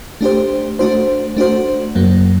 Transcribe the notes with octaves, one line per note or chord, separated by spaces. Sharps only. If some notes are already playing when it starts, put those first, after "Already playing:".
A3 D4 G4 C5
A3 D4 F#4 C5
A3 D4 F#4 C5
F#2 F#3 A#3